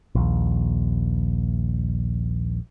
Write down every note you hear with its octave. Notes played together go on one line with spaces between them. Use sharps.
A#1 D#2